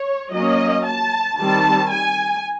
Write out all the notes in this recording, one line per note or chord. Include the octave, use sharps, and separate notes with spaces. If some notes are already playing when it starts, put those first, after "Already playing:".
Already playing: C#5
F#3 A#3 C#4 D#5
A5
D#3 G3 C4 A5
G#5